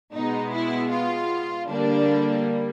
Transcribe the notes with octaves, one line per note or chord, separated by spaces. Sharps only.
B2 G#3 B3 D#4
E4
F4
D3 G3 A#3 D4